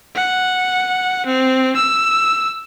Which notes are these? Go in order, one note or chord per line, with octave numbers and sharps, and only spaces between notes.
F#5
C4
E6